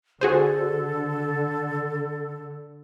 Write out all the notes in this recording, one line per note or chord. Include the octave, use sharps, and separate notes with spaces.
D3 F#4 G#4 A4 C5